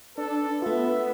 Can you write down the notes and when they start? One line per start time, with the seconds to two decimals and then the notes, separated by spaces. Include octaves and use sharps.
0.18 D4 A4 B4
0.62 A3 B3 F4 E5